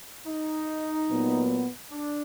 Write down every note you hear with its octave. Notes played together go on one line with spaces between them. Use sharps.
D#4
A#2 F#3 B3
D4